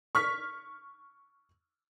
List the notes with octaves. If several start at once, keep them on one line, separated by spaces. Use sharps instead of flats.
C#6 F6 B6